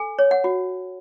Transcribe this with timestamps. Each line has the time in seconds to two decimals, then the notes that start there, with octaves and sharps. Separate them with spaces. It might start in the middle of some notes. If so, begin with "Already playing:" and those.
Already playing: A4 G#5
0.19 C#5
0.31 F#5
0.44 F#4